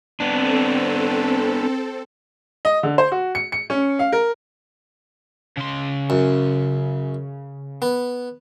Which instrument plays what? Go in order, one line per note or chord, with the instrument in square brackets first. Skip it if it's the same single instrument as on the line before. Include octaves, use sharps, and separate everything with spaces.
[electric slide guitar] B3 D4 [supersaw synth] C4 A4
[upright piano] D#5
D3
C5
F#4
C#7
C#7
C#4
F5
A#4
[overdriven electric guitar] C#3 C6
[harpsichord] F#2
B3